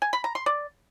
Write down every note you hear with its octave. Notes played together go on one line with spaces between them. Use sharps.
G#5
B5
A#5
C6
D5